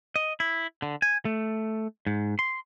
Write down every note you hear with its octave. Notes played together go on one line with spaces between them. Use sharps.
D#5
E4
D3
G#5
A3
G#2
C6